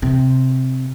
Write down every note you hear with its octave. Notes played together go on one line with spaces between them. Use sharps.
C3